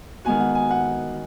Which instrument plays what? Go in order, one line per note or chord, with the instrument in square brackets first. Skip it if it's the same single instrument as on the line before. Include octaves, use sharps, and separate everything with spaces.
[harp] D#3 G#3 B3 F#4 [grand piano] G#5
[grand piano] F#5
G#5
F#5